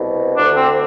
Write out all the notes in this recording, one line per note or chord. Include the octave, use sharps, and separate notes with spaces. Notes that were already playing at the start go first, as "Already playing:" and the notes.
Already playing: C2 B2
D2 D3 D4
C4